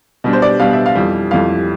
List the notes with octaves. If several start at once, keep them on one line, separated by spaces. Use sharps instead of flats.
B2 G3 D4
C5
D5
B2 G3 D4 F5
E5
F5
F2 E3 G3
F2 E3 G3 F5